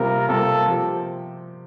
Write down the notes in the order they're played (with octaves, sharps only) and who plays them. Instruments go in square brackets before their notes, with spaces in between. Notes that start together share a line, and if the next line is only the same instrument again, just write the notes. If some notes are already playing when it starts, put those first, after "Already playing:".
Already playing: [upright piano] C3 G3 A#3 F4 [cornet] A#4
[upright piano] C3 G3 A#3 F4 [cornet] A4
[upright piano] F3 C4 G4